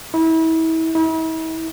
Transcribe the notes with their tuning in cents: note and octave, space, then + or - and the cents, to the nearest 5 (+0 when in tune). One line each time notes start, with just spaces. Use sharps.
E4 -35
E4 -45